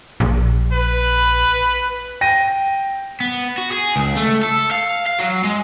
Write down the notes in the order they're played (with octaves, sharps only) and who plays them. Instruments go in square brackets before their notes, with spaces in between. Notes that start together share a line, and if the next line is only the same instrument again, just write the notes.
[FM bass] A#1
[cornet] B4
[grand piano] G5 A#6 D#7
[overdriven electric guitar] B3
F#4
G#4
C#2
A3
A4
F5
F5
F#3
G#3